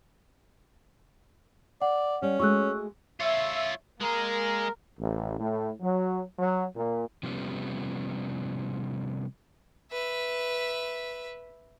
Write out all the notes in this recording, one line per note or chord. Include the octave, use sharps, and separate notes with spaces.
D5 F#5
G3 C#4
G#3 A3 F#4 C#6 E6 F#6
F4 C#5 E5
G#3 A#3 G#4 A#4
A1
A2
F#3
F#3
A#2
C3 F3 G3 B3 C#4
B4 E5